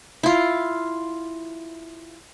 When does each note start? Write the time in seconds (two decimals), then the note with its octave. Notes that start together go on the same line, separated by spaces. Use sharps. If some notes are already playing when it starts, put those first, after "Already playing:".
0.23 E4 F4